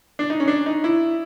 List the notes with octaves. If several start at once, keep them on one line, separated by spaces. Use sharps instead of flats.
D4
D#4
C#4
D4
D#4
E4